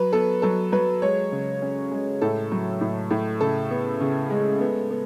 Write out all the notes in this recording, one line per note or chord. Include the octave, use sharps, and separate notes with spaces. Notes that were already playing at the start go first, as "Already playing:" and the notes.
Already playing: F#3 B4
B3 A4
F#3 A4
F#3 B4
G#3 C#5
C#3
C#4
G#3
A2 A4
F#3
A2
A2
C#3 A4
B3
C#3
G#3
B3
B3